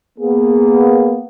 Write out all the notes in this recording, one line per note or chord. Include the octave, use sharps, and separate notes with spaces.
A#3 B3 G#4